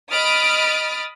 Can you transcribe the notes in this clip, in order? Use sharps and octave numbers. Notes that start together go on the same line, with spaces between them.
D#5 B5 D#6 F6 A6 D7